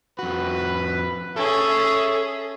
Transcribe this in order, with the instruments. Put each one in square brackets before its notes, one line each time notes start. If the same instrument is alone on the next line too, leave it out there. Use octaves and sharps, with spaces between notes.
[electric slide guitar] F2 F#4 [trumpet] B4
[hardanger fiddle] C#4 G#4 [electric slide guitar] A4 [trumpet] E5